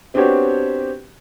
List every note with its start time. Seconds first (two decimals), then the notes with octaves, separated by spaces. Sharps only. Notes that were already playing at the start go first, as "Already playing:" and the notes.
0.14 B3 C4 D4 F#4 G4 C#5